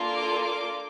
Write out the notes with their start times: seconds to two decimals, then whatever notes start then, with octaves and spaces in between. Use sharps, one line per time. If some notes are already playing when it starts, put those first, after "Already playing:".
Already playing: A#3 D4 F4 A4
0.15 D6
0.44 D6